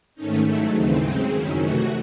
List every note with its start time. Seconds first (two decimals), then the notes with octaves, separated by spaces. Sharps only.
0.15 G#2 D#3 A3 C#4 D#4
0.44 G#2 F#3 A3 E4
0.72 D#2 C#3 E3 C4 D#4
1.01 C#3 G#3 C4 D#4
1.29 F#2 D#3 F#3 C#4 E4
1.58 C3 E3 A3 F#4